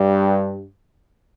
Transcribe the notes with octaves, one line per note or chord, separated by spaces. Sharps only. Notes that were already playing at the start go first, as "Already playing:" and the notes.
Already playing: G2